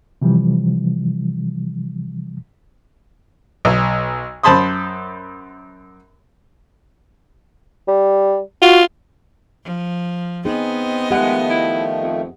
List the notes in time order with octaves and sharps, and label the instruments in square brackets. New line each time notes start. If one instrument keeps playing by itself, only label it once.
[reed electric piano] C3 E3 F3 G3
[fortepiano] B1
F#2 C5 A5 B5 C6 D#6
[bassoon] G3
[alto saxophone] F4 [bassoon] F#4
[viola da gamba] F3
[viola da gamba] B3 D#5 [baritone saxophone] C4 [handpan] D#4 G#4
[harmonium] D#3 F3 A3 [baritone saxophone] G#3 [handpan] G4 F#5
[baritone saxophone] E4
F2